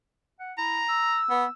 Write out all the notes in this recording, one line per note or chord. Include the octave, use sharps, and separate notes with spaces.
F#5
E4 A#5
E6
B3